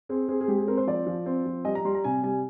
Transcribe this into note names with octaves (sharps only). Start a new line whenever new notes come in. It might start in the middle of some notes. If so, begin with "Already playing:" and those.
C4 G#4
C4 G#4
G#4
G#3 G4
G#4
C4 A#4
C5
F3 D5
F3
C4
F3
G3 D#5
A#5
G3 C6
A#5
C3 G#5
G3 G#5